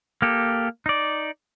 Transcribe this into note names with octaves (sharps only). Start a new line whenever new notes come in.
A#3 G4 A4
D#4 D5